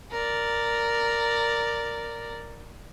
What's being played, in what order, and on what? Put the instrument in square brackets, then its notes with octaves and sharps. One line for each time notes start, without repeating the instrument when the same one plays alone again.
[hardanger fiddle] A#4 D5